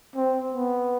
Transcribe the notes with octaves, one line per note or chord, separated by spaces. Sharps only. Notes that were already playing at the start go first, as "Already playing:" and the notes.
C4
B3